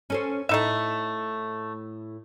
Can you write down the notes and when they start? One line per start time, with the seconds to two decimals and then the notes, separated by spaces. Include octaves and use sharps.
0.10 C#4 A4 C5
0.49 A2 A3 D#4 E5